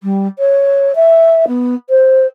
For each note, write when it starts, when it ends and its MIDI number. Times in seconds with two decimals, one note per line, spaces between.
0.03 0.27 55
0.39 0.92 73
0.95 1.45 76
1.47 1.75 59
1.89 2.26 72